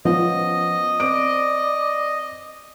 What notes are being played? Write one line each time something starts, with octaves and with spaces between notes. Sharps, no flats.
F3 B3 C#4 D#5
C4 D5 D7